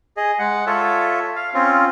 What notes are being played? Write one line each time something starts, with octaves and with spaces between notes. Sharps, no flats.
G#4 D#5
G#3 F#5
F4 A4 C#5 E5
F5
C4 C#4 F4